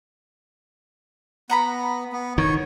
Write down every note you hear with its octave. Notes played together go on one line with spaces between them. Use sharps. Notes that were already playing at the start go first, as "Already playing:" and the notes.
B3 F#5 A#5 B5
B3
D#3 C#5